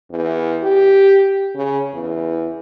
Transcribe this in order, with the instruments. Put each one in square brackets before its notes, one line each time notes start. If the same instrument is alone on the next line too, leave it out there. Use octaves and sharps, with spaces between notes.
[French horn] E2
G4
C#3
E2